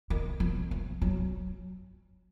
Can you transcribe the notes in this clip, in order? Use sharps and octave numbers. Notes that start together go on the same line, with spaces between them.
D#3
F3
F3
F#3